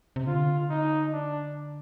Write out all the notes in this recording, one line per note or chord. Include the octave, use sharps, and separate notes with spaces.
C3
D3 F4
D#4
D4